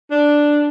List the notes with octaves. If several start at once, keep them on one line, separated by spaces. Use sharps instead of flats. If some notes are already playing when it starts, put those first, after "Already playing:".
D4